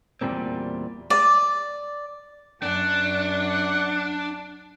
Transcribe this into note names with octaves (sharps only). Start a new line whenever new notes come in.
E2 A#2 E3 G3 A#3 C4
D5
F#2 D4 F#5